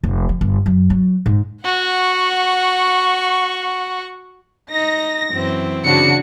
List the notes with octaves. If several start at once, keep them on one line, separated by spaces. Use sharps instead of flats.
F1
F3
G1
F#2
F#3
G#2
F#4 F#5 C#6
D#4 A#6
F#2 E3 C4
C#3 D4 F#4 C#7